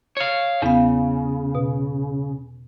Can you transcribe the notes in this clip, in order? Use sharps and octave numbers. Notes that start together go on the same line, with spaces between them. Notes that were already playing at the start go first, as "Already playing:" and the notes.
C#5 F5
E2 C#3 B3 F5
B2